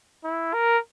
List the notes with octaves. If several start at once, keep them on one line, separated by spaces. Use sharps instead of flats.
E4
A#4